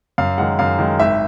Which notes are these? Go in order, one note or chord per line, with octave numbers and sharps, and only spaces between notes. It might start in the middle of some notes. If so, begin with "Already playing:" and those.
F#2 F5
D#3 G#3 F#5
F#2 F5
D#3 G#3
G#1 E5